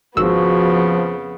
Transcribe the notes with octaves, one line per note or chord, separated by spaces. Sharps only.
G#1 F2 C#3 F3 B3 F#4 E6